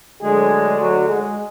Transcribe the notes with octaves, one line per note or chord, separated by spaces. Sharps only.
D2 D3 F#3 G#3 G#4
F#3 F#4
G#3 G#4